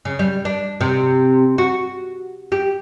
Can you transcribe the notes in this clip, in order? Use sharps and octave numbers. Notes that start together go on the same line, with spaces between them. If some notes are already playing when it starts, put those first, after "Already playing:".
C#3
G3
D4
C3
F#4
G4